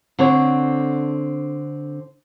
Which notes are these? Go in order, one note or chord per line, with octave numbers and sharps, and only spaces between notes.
D3 C4 D4 C#5